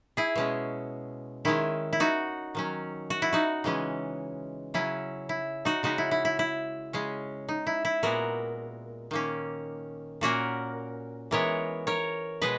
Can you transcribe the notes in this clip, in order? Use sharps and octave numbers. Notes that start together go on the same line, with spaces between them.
E4 G#4
B2 G#3 C#4
D#3 G#3 C#4 E4
E4
D#4 F#4
D#3 F#3 C#4
F#4
E4
D#4 F#4
C#3 E3 G#3 C#4
C#3 F#3 C#4 E4
E4
D#4 F#4
C#3 G#3 C#4 D#4 F#4
E4
E4
E4
E4
C#3 G#3 C#4
D#4
E4
E4
A#2 G#3 B3 F#4 A#4
D#3 A#3 C#4
A#2 A#3 C#4 F#4 A#4
E3 G#3 B3 A#4 C#5
A#4 C#5
B2 G#3 B4 D#5